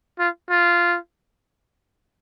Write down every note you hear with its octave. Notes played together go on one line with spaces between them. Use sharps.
F4
F4